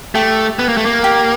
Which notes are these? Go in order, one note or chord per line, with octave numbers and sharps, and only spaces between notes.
A3 G4
B3
A#3
A3
A#3
G4